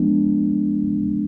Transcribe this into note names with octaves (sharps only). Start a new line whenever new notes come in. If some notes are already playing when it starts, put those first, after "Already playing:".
Already playing: F3 G#3 B3 D4